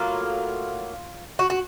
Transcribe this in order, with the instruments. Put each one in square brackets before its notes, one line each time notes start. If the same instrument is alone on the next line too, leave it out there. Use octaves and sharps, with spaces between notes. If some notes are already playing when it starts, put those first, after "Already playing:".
Already playing: [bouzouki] A2 F#3 A#3 F4
F#4
F#4